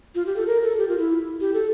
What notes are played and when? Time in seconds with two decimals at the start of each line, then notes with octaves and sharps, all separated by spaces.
0.15 F4
0.26 G4
0.36 A4
0.47 A#4
0.62 A4
0.78 G4
0.88 F4
0.99 E4
1.40 G4
1.54 A4